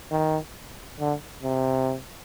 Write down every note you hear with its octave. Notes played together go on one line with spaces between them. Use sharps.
D#3
D3
C3